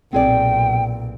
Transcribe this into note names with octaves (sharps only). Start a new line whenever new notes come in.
B1 A#2 C4 G#4 D5 G5